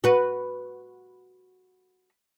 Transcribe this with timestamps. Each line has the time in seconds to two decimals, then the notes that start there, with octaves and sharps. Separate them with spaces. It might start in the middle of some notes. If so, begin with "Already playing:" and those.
0.04 F#4 B4